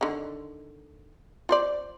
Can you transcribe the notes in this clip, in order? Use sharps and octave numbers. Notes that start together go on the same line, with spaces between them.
D3 D#3
F4 C5 D5